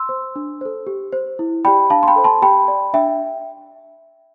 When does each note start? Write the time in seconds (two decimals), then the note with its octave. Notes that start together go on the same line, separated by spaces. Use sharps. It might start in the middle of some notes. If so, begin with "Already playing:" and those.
Already playing: C6 E6
0.09 C5
0.36 D4
0.61 A4 C5
0.87 G4
1.12 C5
1.39 E4
1.65 G4 D5 G5 B5
1.90 D4 F5 A5
2.03 C6
2.07 G5 B5
2.16 A4 C5
2.24 A5 C6
2.42 G4 G5 B5
2.68 D5
2.94 D4 E5 G5